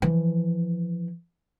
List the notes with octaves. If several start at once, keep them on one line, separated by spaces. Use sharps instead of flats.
E3 F3